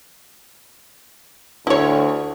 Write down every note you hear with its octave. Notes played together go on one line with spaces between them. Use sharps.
D2 E4 C#5